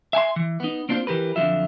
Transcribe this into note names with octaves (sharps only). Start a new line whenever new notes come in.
E5 G#5 A5 C6
E3
B3 D#4
A#3 C4 D4 F4 C5
E3 G4 A#4 B4
F2 D3 F#3 F4 E5